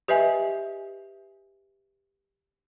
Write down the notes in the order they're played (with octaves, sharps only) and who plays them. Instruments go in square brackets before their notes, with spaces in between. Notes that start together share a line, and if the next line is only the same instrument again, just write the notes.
[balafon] G4 B4 D#5 E5 G#5